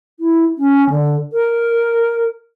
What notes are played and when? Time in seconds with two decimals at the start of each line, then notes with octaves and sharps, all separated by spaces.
0.20 E4
0.58 C#4
0.90 D3
1.33 A#4